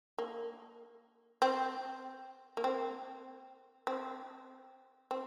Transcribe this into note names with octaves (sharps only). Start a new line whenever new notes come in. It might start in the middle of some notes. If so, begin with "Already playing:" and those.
A#3
C4
A#3
C4
C4
C4